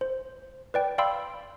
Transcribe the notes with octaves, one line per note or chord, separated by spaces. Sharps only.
C5
B4 D5 G5
D5 F5 G5 B5 C6 E6